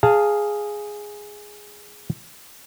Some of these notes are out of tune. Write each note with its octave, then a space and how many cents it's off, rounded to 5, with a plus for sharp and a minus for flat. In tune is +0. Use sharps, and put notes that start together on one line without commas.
G#4 +0 F5 +0 A5 +25